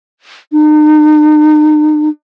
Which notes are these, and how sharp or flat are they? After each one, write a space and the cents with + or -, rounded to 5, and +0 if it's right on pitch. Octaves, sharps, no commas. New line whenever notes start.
D#4 -40